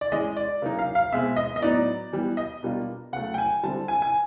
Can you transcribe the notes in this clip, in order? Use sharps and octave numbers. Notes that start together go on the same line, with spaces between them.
D5
E3 G#3 C#4 D#5
D5
C#3 F#3 A#3 D#4
F5
F5
B2 G#3 C4 E5
D#5
D#5
A2 F#3 B3 D#4 D5
E3 G3 B3
D#5
B2 G3 A#3 D4 F4
C#3 F#3 A3 F#5
G5
G#5
D3 G3 C4 E4 A5
G#5
G#5